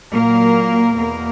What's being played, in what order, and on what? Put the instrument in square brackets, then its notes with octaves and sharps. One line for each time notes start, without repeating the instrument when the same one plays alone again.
[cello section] A#2 F#3 A#3 A#4
E2 B2 A#3 A#4